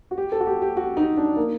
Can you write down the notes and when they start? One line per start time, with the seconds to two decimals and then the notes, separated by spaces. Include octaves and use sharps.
0.11 F#4
0.18 G4
0.32 A4
0.40 F#4
0.47 G4
0.62 G4
0.77 F#4
0.97 D#4
1.17 D4
1.37 A#3